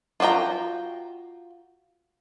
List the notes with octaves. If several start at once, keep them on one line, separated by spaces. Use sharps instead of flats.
F4 F#4 D5 G5 A#5